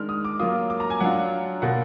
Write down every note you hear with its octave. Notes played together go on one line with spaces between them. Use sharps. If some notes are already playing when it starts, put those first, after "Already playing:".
Already playing: D#3 G#3 D4 F6
D#6
D6
F#3 A#3 F4 D#6
D6
A#5
G#5
F#3 D4 F4 F#5
B2 A#3 F4 F#5